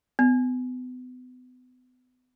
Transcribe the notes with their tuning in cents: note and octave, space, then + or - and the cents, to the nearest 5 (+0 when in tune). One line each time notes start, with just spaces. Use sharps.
B3 +35